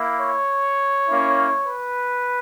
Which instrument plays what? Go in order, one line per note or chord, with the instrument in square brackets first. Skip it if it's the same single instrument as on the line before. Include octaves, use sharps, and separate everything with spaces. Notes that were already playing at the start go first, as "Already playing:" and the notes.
Already playing: [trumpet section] A#3 E4
C#5
A#3 C#4 E4
B4